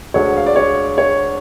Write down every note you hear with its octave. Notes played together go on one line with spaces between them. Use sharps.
D2 D3 G#3 C#5
F5
D5
C#5
C#5